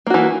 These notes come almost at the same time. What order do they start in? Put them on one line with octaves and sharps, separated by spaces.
A#3 F#4 E3